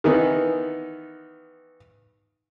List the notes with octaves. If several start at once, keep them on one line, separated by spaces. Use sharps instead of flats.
D#3 E3 B3 D#4